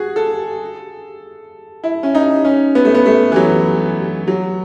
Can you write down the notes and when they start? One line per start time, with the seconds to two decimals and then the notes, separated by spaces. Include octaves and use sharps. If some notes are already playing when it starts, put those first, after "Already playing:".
Already playing: F#4 G#4
0.16 A4
1.84 E4
2.03 C#4
2.15 D#4
2.45 C#4
2.75 B3
2.85 A3
2.95 B3
3.06 A3
3.32 E3
3.36 F#3
4.28 F#3